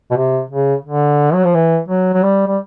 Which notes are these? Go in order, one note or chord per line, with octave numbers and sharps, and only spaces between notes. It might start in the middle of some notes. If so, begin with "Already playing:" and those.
B2
C3
C#3
D3
F#3
F3
E3
F#3
F#3
G3
G3